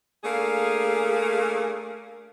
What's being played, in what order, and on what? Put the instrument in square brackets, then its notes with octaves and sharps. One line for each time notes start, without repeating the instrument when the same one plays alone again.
[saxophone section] A3 A#3 D4 G#4 F5